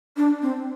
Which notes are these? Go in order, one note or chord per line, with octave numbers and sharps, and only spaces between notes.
D4
C4